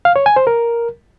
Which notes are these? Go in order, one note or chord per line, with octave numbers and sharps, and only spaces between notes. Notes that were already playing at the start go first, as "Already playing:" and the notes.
F5
C#5
G#5
C5
A#4